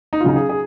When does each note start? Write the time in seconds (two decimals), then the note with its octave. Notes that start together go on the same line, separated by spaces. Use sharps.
0.13 D#4
0.20 F4
0.24 C#3 F#3 D#4
0.36 G#4
0.49 G#4